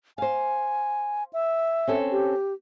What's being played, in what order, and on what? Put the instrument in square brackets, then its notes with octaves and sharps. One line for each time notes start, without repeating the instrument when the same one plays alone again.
[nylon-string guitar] C5 F5 [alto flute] G#5
[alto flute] E5
[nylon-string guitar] C4 C#4 A4
[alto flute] G4